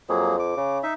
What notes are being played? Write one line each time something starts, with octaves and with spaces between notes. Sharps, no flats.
F2 F#3 A#3 G#4
D6
C#3
D#4 E5